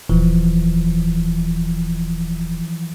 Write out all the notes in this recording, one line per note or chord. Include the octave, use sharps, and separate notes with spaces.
D#1 E3 F3